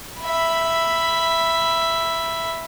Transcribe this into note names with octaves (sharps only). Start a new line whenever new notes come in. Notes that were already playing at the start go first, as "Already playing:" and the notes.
E5 B5